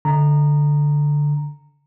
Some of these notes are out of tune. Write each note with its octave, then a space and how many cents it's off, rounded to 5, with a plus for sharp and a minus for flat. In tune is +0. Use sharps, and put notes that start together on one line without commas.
D3 +0 A#5 -5